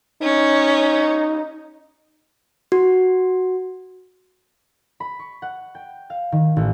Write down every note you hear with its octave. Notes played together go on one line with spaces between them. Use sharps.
C#4 D#4
F#4
B5
C#6
F#5
G5
F5
D#3
A1